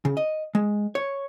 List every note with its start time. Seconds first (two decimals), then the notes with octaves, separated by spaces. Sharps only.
0.05 C#3
0.17 D#5
0.55 G#3
0.95 C#5